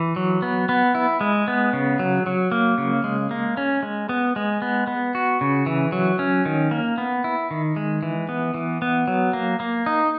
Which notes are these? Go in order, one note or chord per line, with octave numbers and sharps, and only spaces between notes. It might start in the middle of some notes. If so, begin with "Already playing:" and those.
Already playing: E3
F#3
B3
B3
E4
G#3
B3
C#3
F#3
F#3
A#3
C#3
G#3
A#3
C#4
G#3
B3
G#3
B3
B3
F#4
C#3
E3
F#3
C#4
D#3
A#3
B3
E4
D#3
G#3
E3
B3
E3
B3
F#3
A#3
A#3
D#4